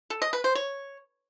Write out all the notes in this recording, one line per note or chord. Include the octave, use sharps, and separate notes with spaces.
A4
D#5
B4
C5
C#5